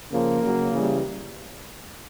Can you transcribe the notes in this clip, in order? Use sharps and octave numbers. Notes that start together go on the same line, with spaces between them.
C#3 F3 A#3
C#3 F#3
C#3 E3 G3